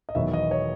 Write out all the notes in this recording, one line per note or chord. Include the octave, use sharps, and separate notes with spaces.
D#5
E1 E2 D#3 F#3 B3 E5
D#5
C#5